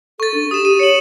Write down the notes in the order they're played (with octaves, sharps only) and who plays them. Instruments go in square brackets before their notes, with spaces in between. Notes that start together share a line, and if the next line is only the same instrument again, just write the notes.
[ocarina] A4 [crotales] C#6 A6
[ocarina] D4
[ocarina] G4 [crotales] D#6 E7
[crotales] D#7
[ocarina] C#5 [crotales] C#7 F#7